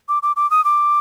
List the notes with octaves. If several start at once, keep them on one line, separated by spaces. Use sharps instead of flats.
D6
D6
D6
D#6
D6